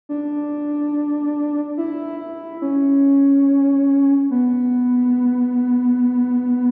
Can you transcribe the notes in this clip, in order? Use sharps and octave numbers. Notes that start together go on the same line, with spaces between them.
D4
E4
E4
C#4
B3